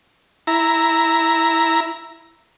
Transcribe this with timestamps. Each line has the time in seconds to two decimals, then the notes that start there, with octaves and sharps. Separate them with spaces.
0.47 E4 A#5